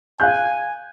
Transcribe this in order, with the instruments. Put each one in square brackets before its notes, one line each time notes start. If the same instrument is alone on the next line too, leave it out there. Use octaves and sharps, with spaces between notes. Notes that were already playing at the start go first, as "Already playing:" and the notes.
[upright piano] F5 F#6 G6 [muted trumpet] G#5